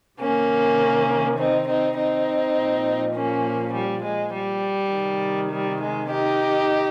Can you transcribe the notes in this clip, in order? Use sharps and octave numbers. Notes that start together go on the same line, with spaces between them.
C3 D#3 A#3 C#4
C4 D#4
C4 D#4
C4 D#4
A#2 F3
A#3 C#4
G3
G#3
G3
C3 D#3
G3
G#3
D#4 G4